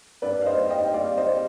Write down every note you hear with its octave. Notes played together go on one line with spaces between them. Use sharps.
G2 B4 D5
F5
C5 D#5
G3
D#5 G5
G5
G3 D5 F5
C5 D#5
G3